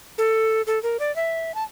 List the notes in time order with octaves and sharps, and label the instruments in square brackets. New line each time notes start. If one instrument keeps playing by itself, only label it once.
[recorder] A4
A4
A#4
D5
E5
A5